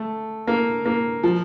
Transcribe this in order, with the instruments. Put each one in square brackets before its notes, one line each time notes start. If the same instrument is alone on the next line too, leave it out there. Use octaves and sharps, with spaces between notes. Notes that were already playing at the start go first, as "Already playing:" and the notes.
Already playing: [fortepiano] A3
A#3
A#3
F3